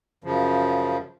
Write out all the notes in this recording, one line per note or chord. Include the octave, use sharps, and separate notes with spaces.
F#2 C#3 F3